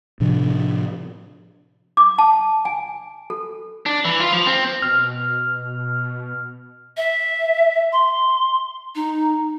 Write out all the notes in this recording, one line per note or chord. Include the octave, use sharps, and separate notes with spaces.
A2 C3 F3 D4
D6
A5
G#5
A4
D4
E3
F4
F3
C4
B2 F6
E5
C6
D#4